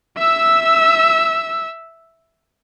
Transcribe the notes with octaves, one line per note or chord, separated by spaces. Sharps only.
E5 E6